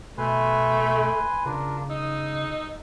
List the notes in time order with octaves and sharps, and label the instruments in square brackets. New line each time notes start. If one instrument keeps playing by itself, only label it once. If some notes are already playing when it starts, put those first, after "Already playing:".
[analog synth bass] B2 [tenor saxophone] A3 [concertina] B4 G#5 C6
[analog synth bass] C#3 [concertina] D4 F4 A#4
[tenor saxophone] D#4 [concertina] D#6 E6